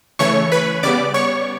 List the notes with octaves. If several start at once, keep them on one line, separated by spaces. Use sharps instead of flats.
C#3 E3 A3 C#5 C#6
B4 B5
C#3 G3 B3 D5 D6
C#5 C#6